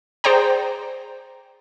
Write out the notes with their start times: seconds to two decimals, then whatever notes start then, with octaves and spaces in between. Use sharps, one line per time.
0.24 G#4 C5 D5 G5 A#5